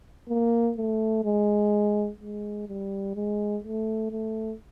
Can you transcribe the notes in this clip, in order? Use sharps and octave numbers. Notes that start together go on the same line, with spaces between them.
A#3
A3
G#3
G#3
G3
G#3
A3
A3